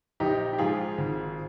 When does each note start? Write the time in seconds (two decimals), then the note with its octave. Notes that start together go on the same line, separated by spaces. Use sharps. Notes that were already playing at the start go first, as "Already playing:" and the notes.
0.20 A#1 D#4 G4
0.53 G4
0.58 G#2 F3 F4 G#4
0.98 G#1